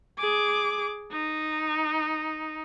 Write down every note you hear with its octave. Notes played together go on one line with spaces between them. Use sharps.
G#4 D6
D#4